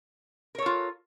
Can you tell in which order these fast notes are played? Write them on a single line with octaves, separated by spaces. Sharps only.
A#4 C#5 A4 F4